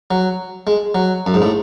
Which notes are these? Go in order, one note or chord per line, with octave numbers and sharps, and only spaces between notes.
F#3
G#3
F#3
F#2
G#2
A2